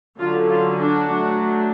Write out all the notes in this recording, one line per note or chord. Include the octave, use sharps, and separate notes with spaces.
D3 F#3 C#4 F4
F4
D4 F#4
F#3 A3 D4